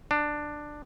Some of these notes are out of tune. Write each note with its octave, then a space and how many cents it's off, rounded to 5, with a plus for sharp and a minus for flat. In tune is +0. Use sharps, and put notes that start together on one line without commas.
D4 +10